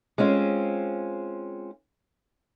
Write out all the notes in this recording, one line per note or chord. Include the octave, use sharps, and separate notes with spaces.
G#3 C4 C#4 F4